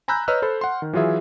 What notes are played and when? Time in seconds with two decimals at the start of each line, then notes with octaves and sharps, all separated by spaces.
0.08 G#5 A#5 B5 E6 F#6 G6
0.28 B4 C#5 D#5 A#5 E6 F6
0.42 A4 C5 B5
0.61 F#5 C6
0.82 D#3
0.93 E3 F#3 F4 G#4 E5